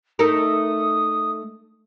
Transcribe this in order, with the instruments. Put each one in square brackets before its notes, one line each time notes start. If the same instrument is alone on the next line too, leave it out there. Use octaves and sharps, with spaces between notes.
[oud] A3 D#4 A#4 [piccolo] D#6